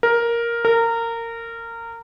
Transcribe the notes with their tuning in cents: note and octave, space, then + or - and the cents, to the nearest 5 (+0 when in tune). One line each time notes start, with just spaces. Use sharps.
A#4 +5
A#4 -20